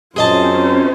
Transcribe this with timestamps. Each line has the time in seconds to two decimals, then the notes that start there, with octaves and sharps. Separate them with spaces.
0.16 F#2 C4 C#4 F4 G#4 C5 D#5 A5